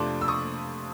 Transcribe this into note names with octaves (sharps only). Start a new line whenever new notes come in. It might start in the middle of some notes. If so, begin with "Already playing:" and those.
Already playing: F2 C3 F3 A3 D4 C6 D6
E6
C#6 D#6